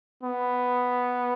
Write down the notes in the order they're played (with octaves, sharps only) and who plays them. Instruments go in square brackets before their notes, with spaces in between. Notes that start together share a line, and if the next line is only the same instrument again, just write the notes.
[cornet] B3